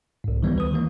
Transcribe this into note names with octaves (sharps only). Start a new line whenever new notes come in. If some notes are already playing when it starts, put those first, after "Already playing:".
C2 G#2
D#3 E3 G3 B3
D2 B4 D#6
D#3 E3 A#3